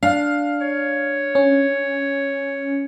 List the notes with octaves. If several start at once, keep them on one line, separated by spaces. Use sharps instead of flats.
D4 F5
C#5
C#4